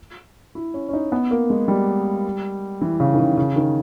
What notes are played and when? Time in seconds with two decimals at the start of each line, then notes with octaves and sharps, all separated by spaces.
0.55 E4
0.74 C#4
0.89 C#4
0.93 D#4
1.12 B3
1.31 A#3
1.50 G#3
1.68 G3
2.81 E3
3.00 C#3
3.14 D#3
3.19 C#3
3.37 C#3
3.56 D#3